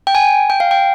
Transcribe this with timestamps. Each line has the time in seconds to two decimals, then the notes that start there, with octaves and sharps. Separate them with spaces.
0.07 G5
0.15 G#5
0.50 G5
0.60 F5
0.71 G5